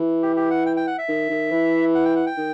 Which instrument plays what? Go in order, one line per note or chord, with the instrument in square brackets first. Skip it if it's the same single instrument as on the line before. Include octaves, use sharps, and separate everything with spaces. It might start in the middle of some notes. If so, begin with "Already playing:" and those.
Already playing: [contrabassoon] E3
[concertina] G4
G4
F#5
G5
G5
F#5
E5
[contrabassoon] D#3
D#3
E3
[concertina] F#5
G5
F#5
G5
[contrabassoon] D#3